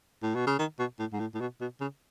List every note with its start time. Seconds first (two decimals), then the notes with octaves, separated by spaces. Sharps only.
0.23 A2
0.35 B2
0.47 C#3
0.59 D#3
0.79 B2
0.99 A2
1.13 G#2
1.20 A2
1.34 A2
1.41 B2
1.61 B2
1.80 C#3